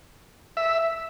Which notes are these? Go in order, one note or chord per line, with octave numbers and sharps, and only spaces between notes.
E5